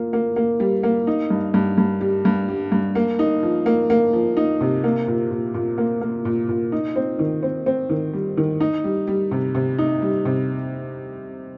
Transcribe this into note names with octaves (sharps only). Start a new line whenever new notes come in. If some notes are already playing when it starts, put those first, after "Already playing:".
Already playing: A#2 A#3
A#3
A#3
G3
A#3
D#4
G2
G2
G2
G3
G2
G3
G2
A#3
D#4
F3
A#3
A#3
F3
D#4
C3
A#3
A#2
A#2
A#2
A#3
A#3
A#2
A#2
D#4
C4
D#3
C4
C4
D#3
G3
D#3
D#4
G3
G3
C3
C3
D#4
G3
C3